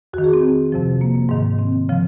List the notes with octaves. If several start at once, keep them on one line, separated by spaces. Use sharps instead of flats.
F2 D#3 F#4
G#4
C4
F2 C3 F3
A#3
G#2 D#3
C4
C#3 F3